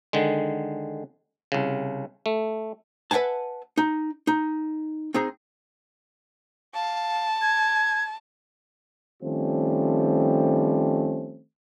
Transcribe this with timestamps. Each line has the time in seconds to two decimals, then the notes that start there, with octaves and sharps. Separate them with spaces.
0.13 D3 D#3 G#3
1.52 C2 C#3
2.26 A3
3.11 B4 E5 F#5 G#5 A5
3.77 D#4
4.27 D#4
5.14 C4 D#4 G#4
6.75 F5 A5
7.42 G#6
9.23 D#3 F3 G3 A3 C4 C#4